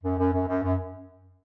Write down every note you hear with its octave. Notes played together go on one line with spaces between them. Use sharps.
F#2
F#2
F#2
F#2
F#2